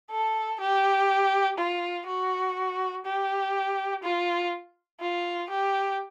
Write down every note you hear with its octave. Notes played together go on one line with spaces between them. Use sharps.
A4
G4
F4
F#4
G4
F4
F4
G4